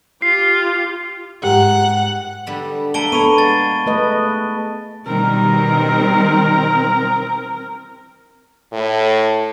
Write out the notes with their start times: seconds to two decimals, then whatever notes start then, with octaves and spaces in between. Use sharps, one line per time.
0.22 F4 G4 C7
1.43 G#2 G4 A#4 F#5
2.47 D3 G3 B3
2.94 D3 A3 A#3 A5 D7 G7
3.12 A#3 B3 C#5 B5 C#6 D#7
3.38 G#3 A6
3.86 A3 B4 D#5
5.05 B2 D#3 G3 C4 A#4
8.72 A2